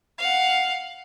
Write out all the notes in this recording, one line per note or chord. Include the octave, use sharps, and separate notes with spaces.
F5 F#5